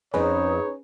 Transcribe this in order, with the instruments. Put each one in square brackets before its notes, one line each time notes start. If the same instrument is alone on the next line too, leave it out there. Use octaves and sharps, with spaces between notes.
[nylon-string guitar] F2 C4 [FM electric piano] C#4 G#4 B4 [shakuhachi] D#4 [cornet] C#5